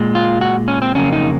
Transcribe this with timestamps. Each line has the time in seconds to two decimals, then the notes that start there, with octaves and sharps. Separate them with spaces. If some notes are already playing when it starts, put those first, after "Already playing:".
Already playing: A#2 G#3
0.15 F4
0.41 F#4
0.68 C#4
0.82 C4
0.95 F2 C#3 F#3 A#3 C#4
1.13 D#4